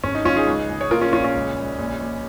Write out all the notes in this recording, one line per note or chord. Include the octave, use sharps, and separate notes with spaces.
G#1 C#4
D#4
G#1 C#4 F4
D#4 G#4
C#2
C#2
C#5
A#1 F4 A#4
C#4 F4
A#1 C#4 F4
C#4
C#2
C#2
A#1
A#1